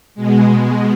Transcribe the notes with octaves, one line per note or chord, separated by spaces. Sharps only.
B2 G#3